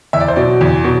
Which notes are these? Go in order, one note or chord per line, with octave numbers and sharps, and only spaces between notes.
E2 E5
D5
C5
B2 F#3 D5
E2
B2 F#3